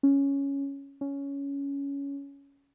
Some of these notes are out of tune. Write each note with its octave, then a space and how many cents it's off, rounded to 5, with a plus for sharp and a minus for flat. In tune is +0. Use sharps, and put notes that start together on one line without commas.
C#4 +0
C#4 +10